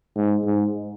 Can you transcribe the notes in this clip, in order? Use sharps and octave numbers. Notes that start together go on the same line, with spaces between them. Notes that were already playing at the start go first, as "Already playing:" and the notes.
G#2
G#2